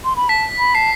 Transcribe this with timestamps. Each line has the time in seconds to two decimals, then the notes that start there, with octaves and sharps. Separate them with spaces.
0.05 C6
0.16 B5
0.29 A5 B6
0.59 B5
0.75 A5 C7